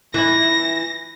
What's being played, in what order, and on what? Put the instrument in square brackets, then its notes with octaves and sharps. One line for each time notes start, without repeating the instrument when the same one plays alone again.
[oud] E3 E4 [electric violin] A#6